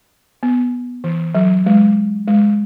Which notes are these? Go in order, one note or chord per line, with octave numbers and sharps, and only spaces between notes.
B3
E3
F#3
G#3
G#3